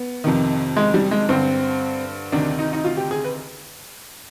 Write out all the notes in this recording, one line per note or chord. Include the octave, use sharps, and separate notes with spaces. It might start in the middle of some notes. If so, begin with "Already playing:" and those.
Already playing: B3
F2 C3 D#3
G#3
G3
G#3
G2 D3 C4
D2 C3 D#3 D4
D#4
D#4
F4
G4
G#4
B4